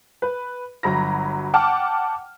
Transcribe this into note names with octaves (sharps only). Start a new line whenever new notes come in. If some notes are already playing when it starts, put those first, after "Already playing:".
B4
G1 F#3 A#5 B5 A#6
F#5 G5 A5 D6 F6